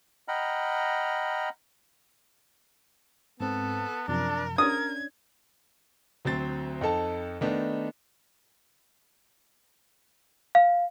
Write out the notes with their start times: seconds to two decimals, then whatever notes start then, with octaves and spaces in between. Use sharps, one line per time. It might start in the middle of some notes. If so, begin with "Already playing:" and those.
0.28 D#5 F#5 G5 A#5 B5 F6
3.40 G#2 B3 C4 A4
4.08 F#2 C3 F3 D4 A#4
4.58 C#4 D4 A#4 D#6 G#6
6.25 D2 F#3 C4 C5 A6
6.81 F2 D#4 A4 A5
7.41 D#3 A3 B3 D4 D#4
10.55 F5